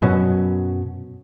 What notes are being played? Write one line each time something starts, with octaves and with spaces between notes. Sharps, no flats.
F#2 B2 F#3 C#4